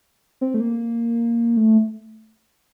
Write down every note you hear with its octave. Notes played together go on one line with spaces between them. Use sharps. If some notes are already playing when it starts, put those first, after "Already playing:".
C4
A3
A#3
A3